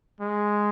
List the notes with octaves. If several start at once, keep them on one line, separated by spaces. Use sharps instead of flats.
G#3